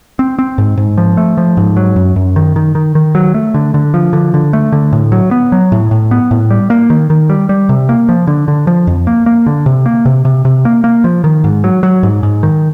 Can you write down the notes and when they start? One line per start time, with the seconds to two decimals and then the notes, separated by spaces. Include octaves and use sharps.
0.19 C4
0.39 C4
0.58 G#2
0.77 G#2
0.98 F3
1.17 A3
1.37 F3
1.57 G#2
1.77 F#3
1.96 F#2
2.16 F#2
2.36 D#3
2.56 D#3
2.75 D#3
2.95 D#3
3.15 F#3
3.34 A3
3.54 D3
3.74 D3
3.94 F3
4.13 D3
4.34 D3
4.53 A3
4.72 D3
4.93 A2
5.12 F#3
5.31 B3
5.52 F#3
5.72 A2
5.91 A2
6.11 B3
6.31 A2
6.50 G3
6.70 A#3
6.90 D#3
7.10 D#3
7.30 G3
7.49 G3
7.69 C3
7.89 A#3
8.09 F3
8.27 D3
8.48 D3
8.67 F3
8.87 F2
9.07 A#3
9.26 A#3
9.46 D3
9.66 C3
9.86 A#3
10.05 C3
10.25 C3
10.45 C3
10.65 A#3
10.84 A#3
11.04 F3
11.24 D#3
11.44 G#2
11.64 F#3
11.83 F#3
12.03 G#2
12.23 G#2
12.43 D#3